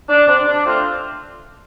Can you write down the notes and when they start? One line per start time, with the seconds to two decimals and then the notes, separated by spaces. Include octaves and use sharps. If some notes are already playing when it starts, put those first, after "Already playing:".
0.09 D4
0.28 C3 D4
0.48 D4
0.66 A3 C4 F4